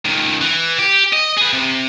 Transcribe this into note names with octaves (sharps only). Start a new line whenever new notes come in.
C#2 D#3
E3
G4
D#5
G#4 B4
C3